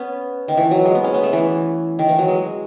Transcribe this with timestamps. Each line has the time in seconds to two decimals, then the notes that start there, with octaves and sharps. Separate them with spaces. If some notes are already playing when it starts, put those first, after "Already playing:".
Already playing: B3 C#4
0.48 D#3
0.57 E3
0.71 F#3
0.85 G#3
0.95 B3
1.04 C#4
1.14 B3
1.24 A3
1.33 E3
1.99 D#3
2.09 E3
2.18 F#3
2.28 G#3